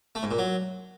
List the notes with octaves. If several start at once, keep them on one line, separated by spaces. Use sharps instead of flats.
A3
G#2
A#2
F#3